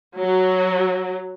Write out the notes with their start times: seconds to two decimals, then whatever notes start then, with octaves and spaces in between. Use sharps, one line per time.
0.16 F#3